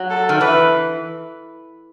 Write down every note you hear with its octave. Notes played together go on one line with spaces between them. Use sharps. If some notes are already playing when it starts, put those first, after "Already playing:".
Already playing: F#3
A4
D#3
E3 B4